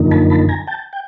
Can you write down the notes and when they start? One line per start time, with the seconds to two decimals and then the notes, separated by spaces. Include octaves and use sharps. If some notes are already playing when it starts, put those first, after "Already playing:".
Already playing: F#2 D3 F3 A#3 D#4
0.11 A5 B5
0.30 A5 B5
0.49 G#5 A#5
0.67 G5 A5
0.93 G5